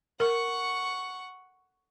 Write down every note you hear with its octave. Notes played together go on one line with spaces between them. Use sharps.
A#4 F#5 C#6